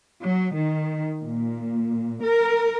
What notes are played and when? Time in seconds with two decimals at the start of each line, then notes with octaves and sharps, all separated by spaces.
0.23 F#3
0.54 D#3
1.21 A#2
2.23 A#4